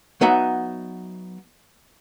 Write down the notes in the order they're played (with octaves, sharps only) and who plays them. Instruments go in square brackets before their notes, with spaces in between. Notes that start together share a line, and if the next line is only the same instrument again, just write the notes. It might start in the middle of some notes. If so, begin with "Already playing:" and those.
[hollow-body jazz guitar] F#3 B3 D#4 E5 F#5